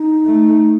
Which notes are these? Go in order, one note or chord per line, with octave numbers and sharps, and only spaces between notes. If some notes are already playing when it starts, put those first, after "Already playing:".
Already playing: D#4
A3